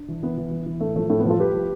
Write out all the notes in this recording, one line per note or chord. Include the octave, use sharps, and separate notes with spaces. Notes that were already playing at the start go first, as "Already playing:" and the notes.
Already playing: D4
E3
E3 B3
E3
E3
E3
A2 A3
F3 A3
A2 A3
B3
F3 F4 A4
F3 G4 B4
F3